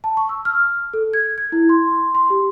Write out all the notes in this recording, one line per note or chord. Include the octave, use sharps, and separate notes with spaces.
A5
C#6
E6
F6
A4
G#6
G#6
E4
C6
C6
G4